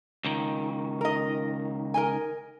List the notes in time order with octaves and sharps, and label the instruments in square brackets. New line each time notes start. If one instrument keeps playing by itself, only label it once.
[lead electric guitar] C#2 D#3
[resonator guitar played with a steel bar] A#4 D#5
A#4 D#5 G#5